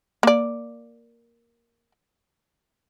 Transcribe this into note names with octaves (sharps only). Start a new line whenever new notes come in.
A#3 D5